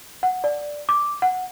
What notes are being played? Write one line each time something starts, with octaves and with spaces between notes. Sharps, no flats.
F#5
D5
D6
F#5